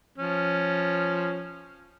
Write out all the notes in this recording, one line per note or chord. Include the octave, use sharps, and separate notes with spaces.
F3 C#4